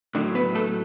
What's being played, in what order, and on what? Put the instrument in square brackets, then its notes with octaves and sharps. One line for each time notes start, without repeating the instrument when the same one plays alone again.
[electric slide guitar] A2 D3 F#3 D4
B3 B4
A3 A4